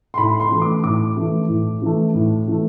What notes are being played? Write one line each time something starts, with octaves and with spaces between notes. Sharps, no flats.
C6
A2 B5
C6
E3 A3
D6
A2 D6
E3 A3
A2
E3 A3
A2
E3 A3